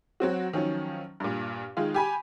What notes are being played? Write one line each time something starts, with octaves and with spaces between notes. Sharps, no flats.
F#3 C4 F#4
D#3 F3 F#3 C#4
G2 A#2
D#3 G#3 F4
G4 G#5 B5